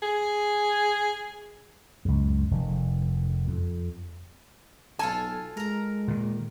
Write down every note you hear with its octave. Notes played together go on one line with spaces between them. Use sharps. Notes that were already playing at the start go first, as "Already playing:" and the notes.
G#4
C#2 F#2
F1 D#3
F2
B1 F4 A4 G#5 A5
G#3 A#4 A#5
A#2 D#3